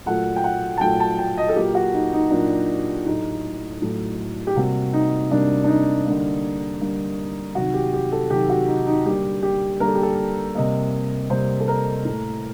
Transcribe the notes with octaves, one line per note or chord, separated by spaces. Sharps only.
A#2 F#3 A3 F#5
G5
F#5
A5
A#2 F#3 A3 G5
A5
G5
D#5
A4
A#2 F#3 A#3 G4
F#4
D#4
D#4
A#2 F#3 A#3 D4
A2 F#3 A3 D#4
A2 F#3 A3
G4
C3 G3 A#3 F#4
D#4
C3 G3 A#3 D4
D4
D#4
D3 G3 A#3
D3 G3 A#3
C3 D#3 F#3 F#4
G4
G4
A4
C3 D#3 F#3 G4
F#4
D#4
D#4
D3 G3 A#3 G4
G4
D3 G3 A#3 A#4
A4
G4
A4
C3 G3 A#3 D#5
C3 G3 A#3 C5
A4
A#4
A2 A3